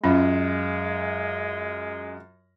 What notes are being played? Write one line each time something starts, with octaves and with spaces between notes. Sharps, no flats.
F#2 G#3 C#4 F4